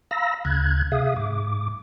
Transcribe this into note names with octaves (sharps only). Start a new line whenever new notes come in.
F5 A#5 B5 E6 A#6
D2 C#3 F#6 G#6
C3 G#4 E5 F5 D#6
G#2 D6